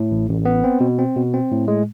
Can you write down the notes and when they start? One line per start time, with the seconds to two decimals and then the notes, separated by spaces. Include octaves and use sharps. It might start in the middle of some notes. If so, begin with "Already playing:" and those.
Already playing: A2
0.11 A1
0.29 A1
0.45 B3
0.64 C4
0.80 B2
0.99 C4
1.16 B2
1.34 C4
1.51 A2
1.68 G#3